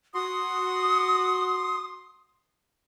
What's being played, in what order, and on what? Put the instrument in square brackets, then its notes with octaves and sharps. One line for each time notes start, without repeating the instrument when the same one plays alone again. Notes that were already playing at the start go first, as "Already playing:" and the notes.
[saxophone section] F#4 [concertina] C6 [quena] D#6